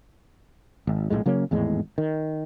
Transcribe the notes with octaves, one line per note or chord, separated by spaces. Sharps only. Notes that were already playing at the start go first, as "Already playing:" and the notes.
G#1
A#1 D#2 A2 G#3
C#3 F#3 A#3 C#4
G#1 E2 A2 G#3
D#3